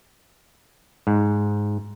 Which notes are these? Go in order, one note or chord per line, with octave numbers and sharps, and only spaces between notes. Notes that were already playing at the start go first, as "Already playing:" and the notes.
G#2